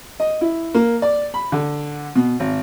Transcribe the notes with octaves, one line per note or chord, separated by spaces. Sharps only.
D#5
E4
A#3
D5
B5
D3
B2
G#1